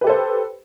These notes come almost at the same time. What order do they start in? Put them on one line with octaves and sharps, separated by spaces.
B4 G4 A4 C5